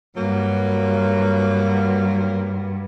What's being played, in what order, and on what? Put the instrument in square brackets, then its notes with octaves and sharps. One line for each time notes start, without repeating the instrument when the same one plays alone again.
[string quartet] G2 [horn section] F#3 A#3